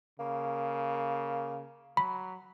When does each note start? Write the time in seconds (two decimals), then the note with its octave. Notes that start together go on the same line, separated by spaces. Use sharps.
0.19 C#3 A#3
1.97 F#3 B5